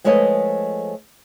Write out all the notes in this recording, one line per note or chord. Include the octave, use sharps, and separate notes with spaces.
F3 G#3 A3 B4 C#5 D#5